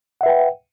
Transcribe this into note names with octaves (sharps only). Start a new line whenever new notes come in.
B4 E5 F#5 G5